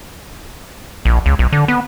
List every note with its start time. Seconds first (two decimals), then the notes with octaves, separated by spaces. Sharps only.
1.05 A#1
1.26 C#2
1.39 B1
1.52 D3
1.68 B3